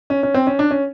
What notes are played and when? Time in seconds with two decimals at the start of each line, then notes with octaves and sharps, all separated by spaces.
0.10 C#4
0.23 C#4
0.34 C4
0.47 C#4
0.59 D4
0.71 C#4